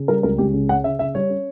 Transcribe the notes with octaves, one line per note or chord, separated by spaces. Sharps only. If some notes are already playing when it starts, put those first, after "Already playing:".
Already playing: C#3
G3 A#4
C#2 A#4
C#2 G4
C#3
C#4 F#5
C#3 E5
C#3 E5
G3 C#5
C#4